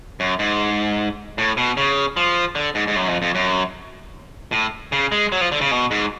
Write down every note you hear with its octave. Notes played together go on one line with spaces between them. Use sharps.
F#2
G#2
A2
B2
C#3
F3
D3
G#2
G#2
F#2
F2
F2
F#2
A2
C#3
G#3
F#3
F3
D3
C#3
B2
G#2